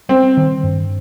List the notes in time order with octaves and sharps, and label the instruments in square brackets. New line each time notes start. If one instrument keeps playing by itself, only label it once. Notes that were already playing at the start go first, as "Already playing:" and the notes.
[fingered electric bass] G3 [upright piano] C4
[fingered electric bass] D#3
G2